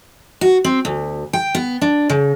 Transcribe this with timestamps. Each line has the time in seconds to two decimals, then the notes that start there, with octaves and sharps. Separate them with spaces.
0.41 F#4
0.64 C4
0.85 D2
1.33 G5
1.55 B3
1.81 D4
2.10 C#3